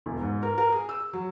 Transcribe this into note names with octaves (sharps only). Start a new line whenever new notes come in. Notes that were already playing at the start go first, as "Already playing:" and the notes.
E1
G#2
A#4
A#4
G#4
E6
F#3